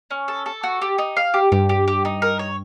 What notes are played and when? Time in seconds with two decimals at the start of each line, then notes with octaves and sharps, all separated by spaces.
0.11 C#4
0.28 A4
0.46 A4
0.63 F#4
0.82 G4
0.98 D#4
1.17 F5
1.34 G4
1.52 G2 G4
1.69 G4
1.88 G4
2.05 D#4
2.22 A#4
2.39 C#5